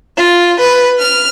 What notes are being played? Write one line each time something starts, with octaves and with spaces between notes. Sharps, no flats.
F4
B4
F6